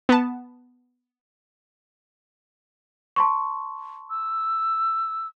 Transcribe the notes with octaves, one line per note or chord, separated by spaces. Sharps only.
B3 A5
A5 C6 C#6
E6